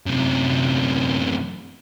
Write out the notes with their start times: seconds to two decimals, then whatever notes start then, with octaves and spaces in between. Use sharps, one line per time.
0.07 F#2 C3